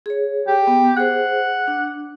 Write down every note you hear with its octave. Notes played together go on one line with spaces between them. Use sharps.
G#4 C#5
G4
B3
G#4 C5 F#5
D4